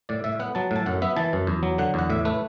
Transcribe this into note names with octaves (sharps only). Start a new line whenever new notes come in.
A2 D5
A2 E5
B3 F#5
F#3 A5
A2 A5
F#2 F#5
B3 E5
E3 A5
F#2
E2
F#3
D3 F#5
E2 F#5
A2 E5
A3 B4